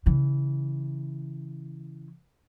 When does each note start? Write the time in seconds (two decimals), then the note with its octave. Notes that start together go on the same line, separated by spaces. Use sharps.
0.06 C#3 E3